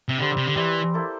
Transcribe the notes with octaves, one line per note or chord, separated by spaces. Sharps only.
C3
D3 G3 C4 G4
C3
D3
E3 G3 C4 G4
A#3 E4 A4 C5